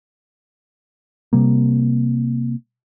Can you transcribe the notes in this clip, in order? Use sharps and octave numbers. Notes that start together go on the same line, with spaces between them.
C3 G3 A#3